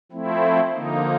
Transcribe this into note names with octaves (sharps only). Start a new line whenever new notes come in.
F3 A3 C4 E4
D3 F3 A#3 D#4